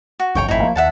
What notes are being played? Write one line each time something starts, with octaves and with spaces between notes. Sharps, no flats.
F#4
G1 C2 F2 C#5 G5 C#6
G#1 F2 A2 D#4 E4
F3 G3 A#3
D#2 E5 F#5 A5